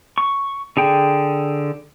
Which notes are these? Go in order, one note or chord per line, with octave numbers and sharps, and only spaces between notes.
C#6
D3 G#4 G5